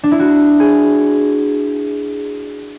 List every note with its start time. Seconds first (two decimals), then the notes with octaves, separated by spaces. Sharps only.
0.04 D4
0.11 E4
0.20 F#4
0.60 G#4